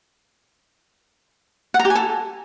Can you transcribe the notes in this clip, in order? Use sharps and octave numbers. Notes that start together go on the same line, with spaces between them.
F#5
A#5
G4
G#5
A4